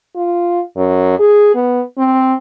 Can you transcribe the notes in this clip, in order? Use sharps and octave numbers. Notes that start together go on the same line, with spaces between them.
F4
F#2
G#4
B3
C4